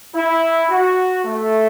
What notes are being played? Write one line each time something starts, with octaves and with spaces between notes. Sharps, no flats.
E4
F#4
A3